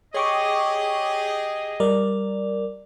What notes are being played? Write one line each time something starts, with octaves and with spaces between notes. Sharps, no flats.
G4 G#4 C#5 D#5 C#6 D6
G3 A#4 D5